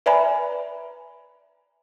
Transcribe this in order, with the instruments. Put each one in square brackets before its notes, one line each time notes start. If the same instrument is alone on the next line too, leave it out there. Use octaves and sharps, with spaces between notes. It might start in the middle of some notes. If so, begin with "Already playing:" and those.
[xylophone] B4 D5 E5 G#5 A#5 B5